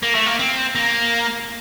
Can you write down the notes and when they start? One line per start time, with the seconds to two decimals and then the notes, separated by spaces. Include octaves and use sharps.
0.03 A#3
0.15 A3
0.26 A#3
0.39 C4
0.75 A#3